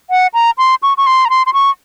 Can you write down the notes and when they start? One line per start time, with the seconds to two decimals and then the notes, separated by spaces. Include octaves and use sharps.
0.10 F#5
0.34 A#5
0.58 C6
0.83 C#6
0.97 C#6
1.06 C6
1.25 A#5
1.30 C6
1.46 C6
1.53 C#6